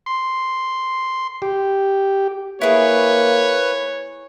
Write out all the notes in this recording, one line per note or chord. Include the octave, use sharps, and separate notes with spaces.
C6
G4
A#3 E4 G#4 B4 C#5